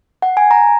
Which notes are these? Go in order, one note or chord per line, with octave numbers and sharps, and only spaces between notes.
F#5
G#5
A#5